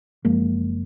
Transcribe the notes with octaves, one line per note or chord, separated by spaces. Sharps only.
F#1 F3 G#3 A#3